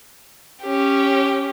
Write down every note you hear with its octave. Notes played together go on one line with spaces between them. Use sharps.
C#4 G4